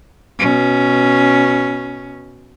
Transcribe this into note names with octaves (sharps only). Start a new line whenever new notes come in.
B2 C#4